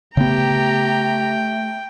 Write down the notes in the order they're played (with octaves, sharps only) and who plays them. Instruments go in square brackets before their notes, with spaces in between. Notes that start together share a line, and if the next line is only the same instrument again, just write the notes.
[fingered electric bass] C#3 B3 [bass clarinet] A3 [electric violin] G4 A#5 [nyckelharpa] G5